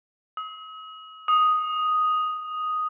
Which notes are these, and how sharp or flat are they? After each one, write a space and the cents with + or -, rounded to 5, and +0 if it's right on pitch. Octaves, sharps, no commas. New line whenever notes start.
D#6 +45
D#6 +0